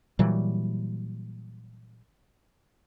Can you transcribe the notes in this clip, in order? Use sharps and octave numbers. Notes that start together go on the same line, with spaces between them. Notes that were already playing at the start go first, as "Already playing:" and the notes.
A#2 E3 F#3 G3